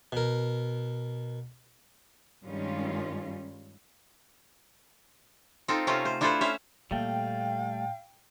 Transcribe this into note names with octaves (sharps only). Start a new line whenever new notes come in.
B2 A#4
G2 D#3 G3 G#3 C#4 F4
C4 D#4 F4 A4
C3 A3 C#4 F4
C5
D4 E4 F4 A4 B4 C5
C#4 C5 E5 F5
A#2 G3 A3 F5 G5